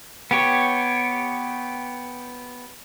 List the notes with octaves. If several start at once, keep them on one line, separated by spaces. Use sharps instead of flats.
B3 G4 C#5